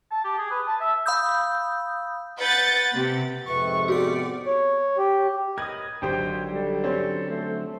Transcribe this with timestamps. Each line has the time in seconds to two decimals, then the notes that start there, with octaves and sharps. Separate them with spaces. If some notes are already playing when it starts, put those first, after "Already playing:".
0.11 A5
0.24 G4
0.38 G#4
0.51 B4
0.67 A5
0.81 E5
1.06 F5 B5 D#6 E6 G6
2.39 B4 F#5 G6 A6
2.93 C3
3.47 F2 G#2 C3 B4 C#6
3.88 B3 F#4 G#4 D5 C#7
4.46 C#5
4.97 G4
5.58 A#4 B4 D#5 D#6 G#6
6.02 G#1 D3 F#3 G4 C5 G5
6.53 G3 A4
6.84 C4 C#4 C6
7.30 A3 C5